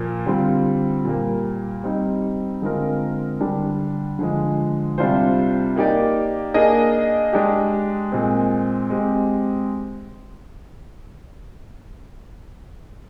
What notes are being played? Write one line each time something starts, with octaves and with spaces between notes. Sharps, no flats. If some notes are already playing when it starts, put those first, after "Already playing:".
Already playing: A#2 F3 A#3
D3 G3 C4 F4
A#2 G3 A#3
G3 C4 D#4
D3 G#3 C4 F4 A#4
D3 G3 D4 G4
D3 F3 G#3
C3 G3 D4 F4 C5
A#3 D#4 G4 D5
A#3 D4 G#4 D#5
G#3 D4 G4
A#2 G#3 C4
G#3 C4 G4